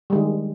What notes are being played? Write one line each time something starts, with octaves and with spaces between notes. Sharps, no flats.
D#3 G3 G#3